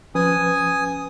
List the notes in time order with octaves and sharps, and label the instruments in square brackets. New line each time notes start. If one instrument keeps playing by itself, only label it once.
[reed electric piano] F3 C#4 B4 [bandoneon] G#5 D#6